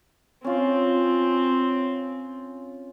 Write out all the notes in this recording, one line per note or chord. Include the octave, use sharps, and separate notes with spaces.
C4 C#4 F4